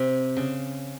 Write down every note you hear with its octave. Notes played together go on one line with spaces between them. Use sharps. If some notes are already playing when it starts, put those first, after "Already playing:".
Already playing: C3
C#3